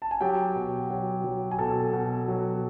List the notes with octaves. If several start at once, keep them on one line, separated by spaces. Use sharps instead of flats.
A5
G#5
F#3 G4 G5
B2
F#3
F#3
G#5
B2 A4 A5
B2
F#3